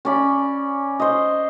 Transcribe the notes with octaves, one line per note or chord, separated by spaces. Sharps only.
C#4 D5 B5
C5 D#5